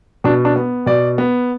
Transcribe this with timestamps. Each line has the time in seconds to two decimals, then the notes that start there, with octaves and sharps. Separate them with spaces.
0.24 B2 D4
0.45 D4
0.56 B3
0.86 B2 D5
1.18 B3